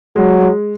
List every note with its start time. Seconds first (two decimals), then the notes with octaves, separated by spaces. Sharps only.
0.16 F#3 G#3
0.40 G#3